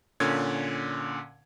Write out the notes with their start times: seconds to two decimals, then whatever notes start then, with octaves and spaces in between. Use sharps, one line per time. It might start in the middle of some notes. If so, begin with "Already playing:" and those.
0.20 A#2 D3 C#4 G#6